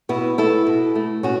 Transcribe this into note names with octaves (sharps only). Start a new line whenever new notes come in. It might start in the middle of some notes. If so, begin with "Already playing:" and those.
B2 B3 E4
A3 E4 A4
B2
A3
B2 C#4 F#4